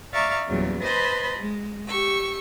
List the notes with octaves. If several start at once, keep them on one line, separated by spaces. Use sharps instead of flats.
D5 E5 F5 A#5 C#6
E2 A#2 C#3 F#3 G3
B4 C5 D#5 A5 B5 C6
G#3
G4 C#6 E6